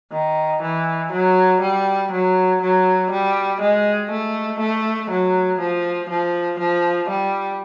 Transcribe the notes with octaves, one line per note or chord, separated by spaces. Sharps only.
D#3
E3
F#3
G3
F#3
F#3
G3
G#3
A3
A3
F#3
F3
F3
F3
G3